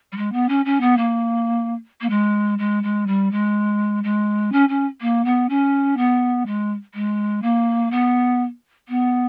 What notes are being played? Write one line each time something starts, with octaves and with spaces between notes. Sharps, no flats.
G3
G#3
B3
C#4
C#4
B3
A#3
A#3
G#3
G#3
G#3
G3
G#3
G#3
C#4
C#4
A#3
B3
C#4
B3
G#3
G#3
A#3
B3
B3